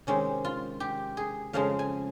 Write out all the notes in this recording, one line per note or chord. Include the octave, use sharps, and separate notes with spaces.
C3 D#3 G#3 C#4
F4
G4
G#4
F2 C#3 F3 G#3 F5
G#5